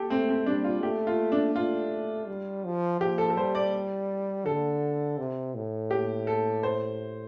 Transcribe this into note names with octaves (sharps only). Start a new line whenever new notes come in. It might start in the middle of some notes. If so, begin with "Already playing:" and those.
Already playing: G4 A4
A3 C4
C4
G3 D4
F4
A3 G4
F4
D4
A3 F4
G3
F3
F3 G4
A4
A4
G3 C5
D5
D3 A4
C3
A2
G4
A4
C5